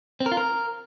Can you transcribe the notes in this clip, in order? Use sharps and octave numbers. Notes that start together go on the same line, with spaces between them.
C4
A#4
F4
A#4